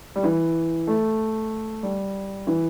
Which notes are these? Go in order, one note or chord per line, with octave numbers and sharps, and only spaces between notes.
G3
E3
A3
G3
E3